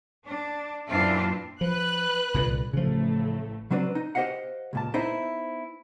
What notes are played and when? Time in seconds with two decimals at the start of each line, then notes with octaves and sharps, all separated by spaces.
0.25 D4
0.88 F#2 A#2 E3 C4 D4 F4
1.61 F3 B4 F#6
2.34 C2 A#2 D3
2.73 A1 A2 C#3 F3 A3
3.71 C#3 F#3 C4 D4 B4
3.95 D#4
4.15 G4 C5 D#5 F5 F#5
4.73 C#2 A#2 A5
4.94 B3 D#4 E4 C5 E5